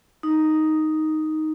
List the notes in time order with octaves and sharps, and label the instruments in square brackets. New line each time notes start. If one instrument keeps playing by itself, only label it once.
[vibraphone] D#4